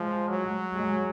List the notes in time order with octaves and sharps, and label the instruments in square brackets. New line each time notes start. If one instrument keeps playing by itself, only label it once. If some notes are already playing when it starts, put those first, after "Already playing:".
Already playing: [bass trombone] F3 [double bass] G#3
[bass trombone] F#3
[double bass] G#3